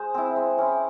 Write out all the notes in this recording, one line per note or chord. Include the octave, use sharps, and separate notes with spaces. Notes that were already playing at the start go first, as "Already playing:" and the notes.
Already playing: G#3 C5
C4 E4
G#3
C#4 E4